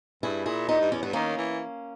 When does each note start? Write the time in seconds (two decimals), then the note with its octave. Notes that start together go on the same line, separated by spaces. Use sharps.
0.23 G2 E4 G#4
0.46 A#2 E4 G#4
0.69 A#2 D#4 G4
0.80 G2
0.92 E2 C#4
1.03 G2 B3
1.13 D#3 A#3 C#4
1.37 E3